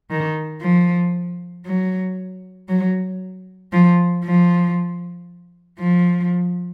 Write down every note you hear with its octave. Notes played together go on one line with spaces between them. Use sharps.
D#3
F3
F#3
F#3
F3
F3
F3